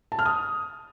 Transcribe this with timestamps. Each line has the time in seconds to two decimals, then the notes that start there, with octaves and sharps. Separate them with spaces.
0.12 A5
0.19 F6
0.26 D#6